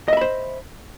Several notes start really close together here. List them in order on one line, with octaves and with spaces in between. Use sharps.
D#5 E5 B5 C5